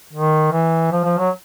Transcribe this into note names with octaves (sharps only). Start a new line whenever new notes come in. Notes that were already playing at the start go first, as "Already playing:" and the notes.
D#3
E3
F3
F3
F#3